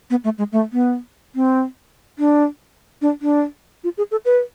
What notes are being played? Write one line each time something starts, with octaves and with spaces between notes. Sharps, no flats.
B3
A3
G#3
A3
B3
C4
D4
D4
D4
F4
G#4
A4
B4